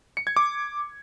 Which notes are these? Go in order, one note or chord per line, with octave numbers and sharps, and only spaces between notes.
C#7
G#6
D6